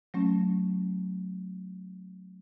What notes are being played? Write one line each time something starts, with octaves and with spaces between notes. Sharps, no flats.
F#3 A3 C#4